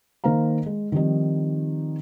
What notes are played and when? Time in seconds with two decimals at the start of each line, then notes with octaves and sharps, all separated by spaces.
0.24 D#3 A#3 C5 F5 A#5
0.66 G#3
0.92 D#3 F3 G3 C4 D#4